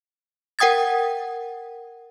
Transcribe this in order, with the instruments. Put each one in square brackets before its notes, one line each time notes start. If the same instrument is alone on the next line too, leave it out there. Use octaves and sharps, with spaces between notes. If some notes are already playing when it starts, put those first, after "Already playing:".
[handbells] A#4 F#5 G5 D#6 G#6 A6